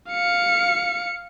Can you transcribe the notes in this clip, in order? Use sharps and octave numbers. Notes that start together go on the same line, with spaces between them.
F5 C#7